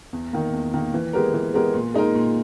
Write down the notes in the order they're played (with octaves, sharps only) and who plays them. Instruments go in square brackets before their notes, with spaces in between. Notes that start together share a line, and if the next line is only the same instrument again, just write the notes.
[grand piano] E2
D#3 A#3
E2
D#3 A#3
E3
G#3 B3 G4 A#4
E3
G#3 B3 G4 A#4
A#2
G#3 D#4 A#4
A#2